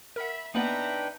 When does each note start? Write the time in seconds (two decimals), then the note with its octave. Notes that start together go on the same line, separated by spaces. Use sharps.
0.16 A#4 E5 F#5 B5
0.55 A#3 B3 D4 D#4 B4 E5 G5 A#5